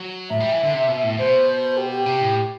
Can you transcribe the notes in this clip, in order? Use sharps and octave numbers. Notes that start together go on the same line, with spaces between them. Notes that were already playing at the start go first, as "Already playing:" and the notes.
Already playing: F#3
A2 E5
G3
E3
D3
C3
B2
A2
B2 C5
C5
G4
G4
C3
A2